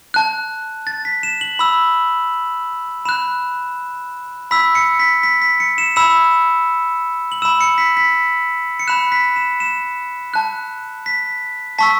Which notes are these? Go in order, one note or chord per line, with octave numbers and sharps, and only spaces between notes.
A5 F#6
A6
B6
E7
F#7
B5 E6 F#7
B5 F#6 E7
B5 E6 B6
C#7
B6
B6
B6
C#7
E7
B5 E6 E7
F#7
B5 E6 E7
C#7
B6
B6
C#7
B5 F#6 E7
B6
E7
E7
A5 F#6
B6
A5 C#6 E6 B6